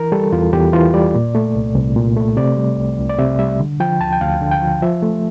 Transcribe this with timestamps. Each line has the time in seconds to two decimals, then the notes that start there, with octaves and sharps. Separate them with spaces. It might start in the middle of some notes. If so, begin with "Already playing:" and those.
Already playing: E3 A#4
0.12 G3 A4
0.32 E2 F4
0.53 E2 G4
0.73 E3 F4
0.94 G3 D5
1.15 A#2
1.35 A3
1.55 C2
1.76 C2
1.96 A#2
2.17 A3
2.37 C3 D5
2.57 G3
2.78 C2
2.98 C2
3.10 D5
3.19 C3 E5
3.39 G3 E5
3.60 D3
3.80 F3 G5
4.01 D2 A5
4.13 G5
4.21 D2 F5
4.41 D3
4.51 G5
4.62 F3
4.82 F3 E5
5.02 A3